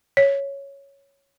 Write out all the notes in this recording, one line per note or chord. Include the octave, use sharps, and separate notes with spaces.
C#5